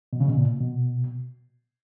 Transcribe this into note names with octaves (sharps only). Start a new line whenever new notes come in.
B2
C#3
B2
A#2
B2